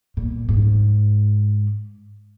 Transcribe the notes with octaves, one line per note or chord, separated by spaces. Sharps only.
A#2
G#2